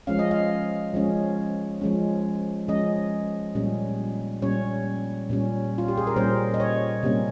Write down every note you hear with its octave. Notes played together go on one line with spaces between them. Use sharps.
F3 G#3 C#4 F5
D#5
F5
F3 G#3 C#4
F3 G#3 C#4
F3 G#3 C#4 D#5
A#2 G3 C#4
A#2 G3 C#4 C#5
A#2 G3 C#4
F4
G4
G#4
A#4
A#2 G3 C#4 C5
D#5
C#5
C3 G3 A#3 C#4